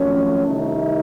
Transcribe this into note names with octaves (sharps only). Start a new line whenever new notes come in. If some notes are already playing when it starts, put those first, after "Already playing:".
Already playing: F2 D#3 F#3 A3 C#4
C2 C3 D#3 A3 D#4